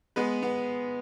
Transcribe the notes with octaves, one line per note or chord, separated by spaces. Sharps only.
G#3 B3 B4
B3